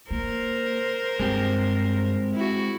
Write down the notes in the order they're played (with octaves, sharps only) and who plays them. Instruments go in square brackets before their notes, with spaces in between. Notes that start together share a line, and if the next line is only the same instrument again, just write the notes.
[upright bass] A#3 [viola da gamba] A#4 C5
[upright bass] G2 [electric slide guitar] G#3 C4 G4
[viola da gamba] E4 F#4